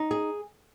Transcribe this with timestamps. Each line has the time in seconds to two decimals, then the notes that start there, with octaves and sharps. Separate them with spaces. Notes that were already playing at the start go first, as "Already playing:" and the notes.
Already playing: D#4
0.11 G#4